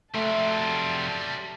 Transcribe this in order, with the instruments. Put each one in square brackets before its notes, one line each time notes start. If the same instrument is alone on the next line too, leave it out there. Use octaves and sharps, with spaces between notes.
[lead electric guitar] F2 C3 [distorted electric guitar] F#3 G3 [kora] A3 [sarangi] A5